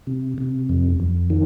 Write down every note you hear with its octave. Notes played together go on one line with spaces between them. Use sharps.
C3
C3
F2
F2
D#3